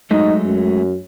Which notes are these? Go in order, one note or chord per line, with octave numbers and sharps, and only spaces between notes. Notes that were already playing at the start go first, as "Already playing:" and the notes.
F#3 G#3 A3 D#4
F#2